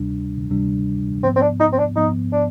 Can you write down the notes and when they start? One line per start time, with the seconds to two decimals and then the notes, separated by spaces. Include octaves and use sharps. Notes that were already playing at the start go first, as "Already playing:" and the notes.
Already playing: D2 C3 G3 D4
0.51 D2 C3 G3 D4
1.23 G#2 F3 B3 C4
1.36 C4
1.42 D4
1.60 D#4
1.72 C4
1.78 D4
1.96 G#2 F3 B3 D#4
2.32 D4